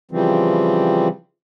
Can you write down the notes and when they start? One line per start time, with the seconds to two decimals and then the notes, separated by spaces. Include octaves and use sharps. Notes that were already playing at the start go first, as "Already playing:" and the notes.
0.11 C#3 E3 F3 G3 C4